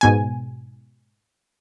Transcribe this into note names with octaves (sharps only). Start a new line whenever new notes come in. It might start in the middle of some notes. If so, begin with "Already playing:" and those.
G#2 B2 G#5